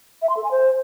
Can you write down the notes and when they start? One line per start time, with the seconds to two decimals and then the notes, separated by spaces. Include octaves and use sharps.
0.22 E5
0.29 C6
0.37 A4
0.44 G#5
0.51 C5